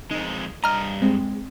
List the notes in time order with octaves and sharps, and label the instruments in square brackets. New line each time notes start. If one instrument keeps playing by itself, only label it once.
[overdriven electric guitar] F2 G#3 [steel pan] D#4
[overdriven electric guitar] G2 D#5 [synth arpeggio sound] A#5 F6
[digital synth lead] G#3 [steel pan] C4